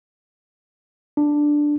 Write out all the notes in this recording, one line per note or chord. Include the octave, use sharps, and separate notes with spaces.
D4